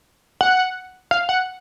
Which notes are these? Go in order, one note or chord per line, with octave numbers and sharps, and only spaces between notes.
F#5
F5
F#5